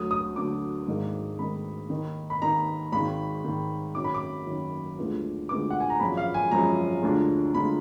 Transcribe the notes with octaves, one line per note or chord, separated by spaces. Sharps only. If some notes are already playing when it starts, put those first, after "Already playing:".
Already playing: D2 D3 F#3 D#6
D#6
D2 D3 F#3 D6
G#1 G#2 D#3 A#3 D#4
G#1 G#2 D#3 A#3 D#4 B5
D#2 D#3 A#3 D#4
B5
D#2 D#3 A#3 D#4 A#5
G#1 G#2 D#3 B5
G#1 G#2 D#3
F#2 D#3 F#3 D6
B5
D6
F#2 D#3 F#3
D2 D3 G#3 B3 F4
D2 D3 G#3 B3 F4 D6
F#5
G#5
A#5
G#1 F#2 F3 G#3 B5
F5
G#5
G#1 F#2 F3 G#3 A#5
D2 D3 G#3 D4 F4
D2 D3 G#3 D4 F4 B5